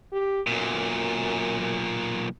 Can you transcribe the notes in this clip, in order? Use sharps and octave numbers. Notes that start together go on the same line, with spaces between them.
G4
B1 F#2 A#2